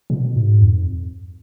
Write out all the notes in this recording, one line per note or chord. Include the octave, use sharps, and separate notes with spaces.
B2
G#2
F2